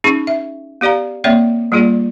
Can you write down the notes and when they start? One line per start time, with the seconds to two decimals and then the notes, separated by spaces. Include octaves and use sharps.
0.04 C#4 D#4 G#4 C#6
0.27 E5
0.81 B3 G4 D5 F5 A#5
1.24 A#3 C4 C#5 D5 E5
1.72 G3 A#3 F4 G#4 D5